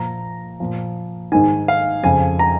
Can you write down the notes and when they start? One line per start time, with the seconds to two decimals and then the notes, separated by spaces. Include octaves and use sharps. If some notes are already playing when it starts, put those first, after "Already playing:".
Already playing: A#2 F3 A#5
0.60 A#2 F3
1.32 G#2 D#3 G#5
1.68 F5
2.03 F2 C#3 F3 G#5
2.39 A#5